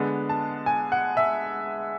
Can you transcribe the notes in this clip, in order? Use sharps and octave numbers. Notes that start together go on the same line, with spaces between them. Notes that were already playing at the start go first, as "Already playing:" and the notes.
Already playing: D3 G#3 B3
A5
G#5
F#5
E5